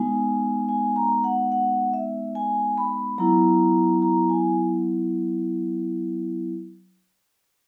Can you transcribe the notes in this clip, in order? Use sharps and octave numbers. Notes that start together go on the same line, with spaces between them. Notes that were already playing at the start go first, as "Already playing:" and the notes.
Already playing: G#3 B3 D#4 G#5
G#5
A#5
F#5
F#5
E5
G#5
B5
F#3 B3 E4 A#5
A#5
G#5